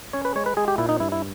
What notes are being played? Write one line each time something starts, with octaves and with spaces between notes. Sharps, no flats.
C#4 C#5
B4
G#3 C#5
B4
G#3 G#4
G4
A#2 E4
D#4
G2 E4
E4